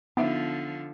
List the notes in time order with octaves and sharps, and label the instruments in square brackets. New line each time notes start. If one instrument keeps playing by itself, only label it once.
[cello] D3 F3 [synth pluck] B3 [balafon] D#4 E5